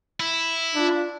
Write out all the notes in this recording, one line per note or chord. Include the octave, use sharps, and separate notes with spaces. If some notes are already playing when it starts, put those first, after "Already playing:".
E4
D4 F4